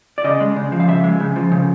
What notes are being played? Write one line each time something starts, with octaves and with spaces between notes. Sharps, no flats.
D5
C#3 D#5
G#3
C#3
F3
F5
C#3 E5
G#3
C#3
F3
C#3